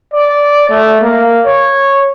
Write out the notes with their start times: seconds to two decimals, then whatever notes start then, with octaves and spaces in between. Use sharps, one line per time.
0.14 D5
0.70 A3
1.01 A#3
1.45 C#5